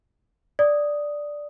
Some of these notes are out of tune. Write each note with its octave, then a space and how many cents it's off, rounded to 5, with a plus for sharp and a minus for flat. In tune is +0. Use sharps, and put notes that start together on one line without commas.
D5 +0 D#6 +0